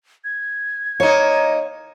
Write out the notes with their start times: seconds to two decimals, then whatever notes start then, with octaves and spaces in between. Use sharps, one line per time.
0.24 G#6
1.00 A#3 D#4 C#5